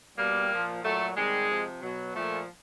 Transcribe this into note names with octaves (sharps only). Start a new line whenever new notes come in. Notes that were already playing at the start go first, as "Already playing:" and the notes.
B2 G3 A#3
A#2 F3
A#2 F#3 A3
C3 D#3 G3 G#3
C3 F3
B2 F#3
A#2 F3 A3